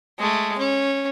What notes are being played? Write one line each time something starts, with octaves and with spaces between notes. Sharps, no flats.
G#3 A3
C#4